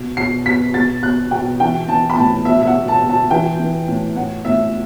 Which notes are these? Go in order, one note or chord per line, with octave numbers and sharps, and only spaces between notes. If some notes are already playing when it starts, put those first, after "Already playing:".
Already playing: B2
B2 C7
B2 B6
B2 A6
B2 F#6
B2 G5
E3 G5
E3 A5
B5
A2 A5
B2 E5
E5
F#5
B2
A5
B2
A5
E3 G5
E3
A2
A2 F#5
A2 E5